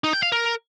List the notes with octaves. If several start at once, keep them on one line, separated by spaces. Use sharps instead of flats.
D#4
G5
F5
A#4